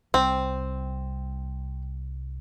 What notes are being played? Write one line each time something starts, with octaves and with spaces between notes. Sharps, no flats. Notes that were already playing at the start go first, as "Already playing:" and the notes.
C2 G3 C4